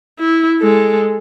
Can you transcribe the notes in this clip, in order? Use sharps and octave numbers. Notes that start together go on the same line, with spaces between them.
E4
G#3 A4